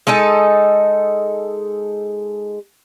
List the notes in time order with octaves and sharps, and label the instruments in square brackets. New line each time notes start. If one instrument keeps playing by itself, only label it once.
[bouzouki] G#3 D#4 A4 D#5